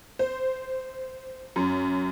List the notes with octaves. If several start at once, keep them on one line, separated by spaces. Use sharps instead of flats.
C5
F#2